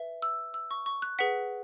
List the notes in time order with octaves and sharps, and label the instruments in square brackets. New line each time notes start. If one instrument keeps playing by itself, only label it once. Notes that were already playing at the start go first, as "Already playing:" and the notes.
Already playing: [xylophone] B4 E5
E6
E6
C#6
C#6
F#6
G#4 B4 F#5 B6